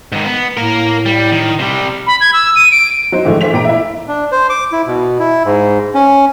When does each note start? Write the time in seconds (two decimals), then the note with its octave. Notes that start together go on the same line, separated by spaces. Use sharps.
0.12 G#2 D#3
0.25 B3
0.57 A2 A#3 A#4
1.06 G3
1.32 D#3
1.59 C3 G3
2.07 B5
2.21 G#6
2.33 E6
2.56 D#7
2.72 D7
3.12 F#3 D#4 C5
3.25 A2 D3 E3 F3 G#3 A3
3.41 E3 G#3 A3 C5 B6 F7
3.53 A#2 G5 A#5 D7
3.65 E4 E5
4.08 D4
4.32 C5
4.50 D6
4.72 E4
4.87 B2
5.19 E4
5.45 G#2
5.94 C#4